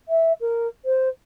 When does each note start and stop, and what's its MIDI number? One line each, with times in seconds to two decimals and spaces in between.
0.08 0.33 76
0.41 0.68 70
0.85 1.09 72